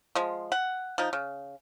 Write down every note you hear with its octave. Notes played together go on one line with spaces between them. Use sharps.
F3 G#3
F#5
F3 D#4
C#3